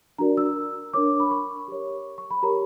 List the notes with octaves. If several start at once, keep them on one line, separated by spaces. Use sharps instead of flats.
D4 F#4 A#4 D5 A#5
E6
D4 A#4 C#5 D6
B5
C#6
G4 A#4 C#5
C#6
B5
G4 A#4 C#5 A#5